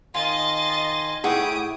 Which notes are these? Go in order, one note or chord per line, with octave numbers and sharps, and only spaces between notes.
D#3 F4 D#5 G#5 C6 A6
A2 E4 G4 G#4 F#5 C#6 D#6 D7